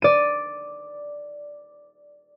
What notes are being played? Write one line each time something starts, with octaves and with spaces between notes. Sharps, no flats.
D5 D#7